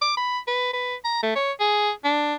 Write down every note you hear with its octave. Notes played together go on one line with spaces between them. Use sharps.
D6
B5
B4
B4
A#5
A3
C#5
G#4
D4